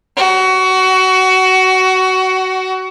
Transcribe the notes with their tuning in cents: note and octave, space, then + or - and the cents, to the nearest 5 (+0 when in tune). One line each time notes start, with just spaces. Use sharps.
F#4 +20